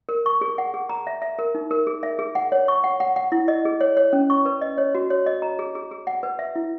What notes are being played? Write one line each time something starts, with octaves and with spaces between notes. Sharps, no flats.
A#4
C#6
G#4
F#5
G#4
A#5
E5
E5
A#4
D#4
A#4
G#4
E5
G#4
F#5
C#5
C#6
F#5
F#5
F#5
E4
D#5
G#4
C#5
C#5
C#4
C#6
B4
D#5
C#5
F#4
C#5
D#5
A#5
G#4
G#4
G#4
F#5
B4
E5
E4